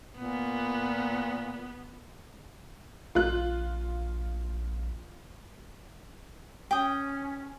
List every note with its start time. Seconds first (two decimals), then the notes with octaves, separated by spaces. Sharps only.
0.18 A#2 B3
3.15 A#1 F4 F#6
6.71 C#4 G5 D#6